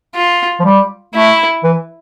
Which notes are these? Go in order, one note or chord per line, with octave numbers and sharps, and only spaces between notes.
F4
F3
G3
A3 E4
E3